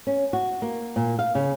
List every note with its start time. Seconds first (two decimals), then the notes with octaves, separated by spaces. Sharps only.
0.07 C#4
0.33 F#4
0.62 A#3
0.96 A#2
1.19 F5
1.35 C#3